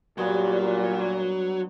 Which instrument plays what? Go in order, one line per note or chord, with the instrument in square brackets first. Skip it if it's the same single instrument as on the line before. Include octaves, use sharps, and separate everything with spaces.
[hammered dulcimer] G2 B3 [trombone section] A#2 [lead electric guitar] F#3